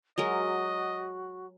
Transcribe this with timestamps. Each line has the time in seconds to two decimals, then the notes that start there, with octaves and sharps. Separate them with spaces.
0.18 F#3 G#3 F#4 A#4 D#5